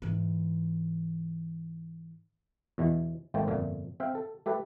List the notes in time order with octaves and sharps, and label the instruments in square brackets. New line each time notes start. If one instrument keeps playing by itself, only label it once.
[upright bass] G#2 E3
[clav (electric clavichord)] E2 B2 E3
G#1 A3 A#3 C5 G5 A5
G1 F2 A#2 A3
C4 E5 F5 G5
A4
A3 G4 A4 B4